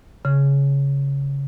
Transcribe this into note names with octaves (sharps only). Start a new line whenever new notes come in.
C#3